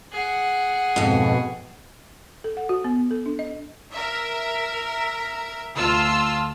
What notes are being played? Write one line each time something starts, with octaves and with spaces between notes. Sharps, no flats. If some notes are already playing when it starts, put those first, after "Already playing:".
G#4 F#5
F2 G#2 B2
A4
F#5
F#4
B3
A4
D4
D#5
A#4 E5
D2 F4 A5 E6